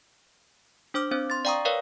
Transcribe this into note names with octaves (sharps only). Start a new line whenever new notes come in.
D4 C5 D6 F6
C4 D4 C5
C6 A6
D5 F5 G5 A#5 C#6 D#6
A#4 B4 C#5 D5 F5